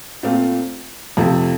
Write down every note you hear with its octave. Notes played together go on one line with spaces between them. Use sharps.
A#2 A3 C4 F4
F2 C3 F3 A3